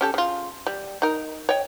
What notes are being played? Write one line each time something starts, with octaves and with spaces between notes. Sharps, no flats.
C#4 G4 A4
C#3 F4
G3
D#4 A#4
C#5 D#5 G5